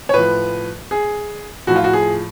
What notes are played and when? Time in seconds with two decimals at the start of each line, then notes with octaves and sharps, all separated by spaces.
0.09 C#5
0.14 A2 F3 B4
0.91 G#4
1.67 A2 F3 F#4
1.76 F4
1.84 F#4
1.93 G#4